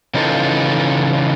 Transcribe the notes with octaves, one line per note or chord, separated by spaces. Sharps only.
C#3 E3 D#4 F4 A4